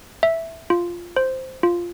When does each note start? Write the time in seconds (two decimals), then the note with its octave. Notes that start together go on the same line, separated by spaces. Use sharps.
0.23 E5
0.70 F4
1.17 C5
1.63 F4